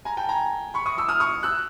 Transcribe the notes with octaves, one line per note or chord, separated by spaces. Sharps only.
G#5 A#5
G5 A5
G#5 A#5
B5 C#6
C#6 D#6
D6 E6
D#6 F6
C#6 D#6
E6 F#6